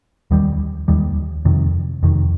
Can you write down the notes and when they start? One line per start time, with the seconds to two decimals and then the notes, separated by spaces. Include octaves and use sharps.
0.31 D#2 D#3 G3
0.88 D#2 D#3 G3
1.45 F2 C3 D#3
2.03 F2 C3 D#3